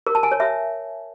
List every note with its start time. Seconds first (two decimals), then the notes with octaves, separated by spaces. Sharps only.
0.07 A#4
0.15 A5
0.23 G#5
0.32 C#5
0.40 E5